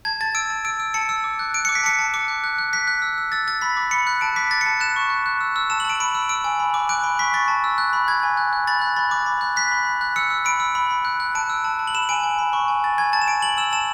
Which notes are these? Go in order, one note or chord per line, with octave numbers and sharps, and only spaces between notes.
A5 G#6
A5 A6
E6 D7
A5
E6 D7
E6
A5 C#7
E6
D6
F#6
F#6 D7
D6 C#7
B6
A5 C#7
A5
D6 C#7
F#6
F#6
F#6
F#6 B6
F#6
E6
E6
E6 A6
E6 A6
B5 B6
D6
B5 C#7
F#6
A5 D7
D6 B6
F#6 A6
C#7
A5
F#6 E7
C#6
F#6
F#6
E6
E6
A5 E7
F#7
A5 D7
B5 D7
E6
E6 D7
G#5
B5
D6
F#6 D7
B5
C#6 B6
C#6 A6
A5
E6
F#6
B5
B5 G#6
G#5
F#6
F#6
B5 A6
F#6
B5 A6
D6
B5
F#6
F#6 B6
B5
B5
F#6
E6 C#7
E6
B5 D7
E6
B5
B5
F#6
F#6
A5 D7
E6
A5
A5
F#7
B5 E7
G#5 D7
G#5
B5
C#6
G#5
G#5 A6
G#5 G#6
A5 A6
E7
A5 D7
A5 F#7
E6 E7
A5 E7